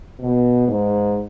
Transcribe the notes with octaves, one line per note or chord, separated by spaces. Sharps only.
B2
G#2